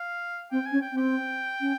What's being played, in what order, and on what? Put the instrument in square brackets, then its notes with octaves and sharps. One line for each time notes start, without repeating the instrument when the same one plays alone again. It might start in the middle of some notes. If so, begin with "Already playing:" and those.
Already playing: [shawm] F5
[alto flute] C4 [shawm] G5
[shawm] G#5
[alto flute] C#4
[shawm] G5
[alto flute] C4
[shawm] G5
[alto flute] C#4